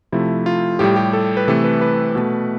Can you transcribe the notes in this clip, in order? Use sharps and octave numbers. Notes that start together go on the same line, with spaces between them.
C3 F3 A3 E4
F4
A2 G3 G4
G4
A4
B4
C3 E3 A3 A4
B4
B4
B2 A3